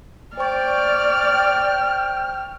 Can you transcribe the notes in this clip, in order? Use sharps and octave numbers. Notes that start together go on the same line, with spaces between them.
C5 D5 G5 C#6 F6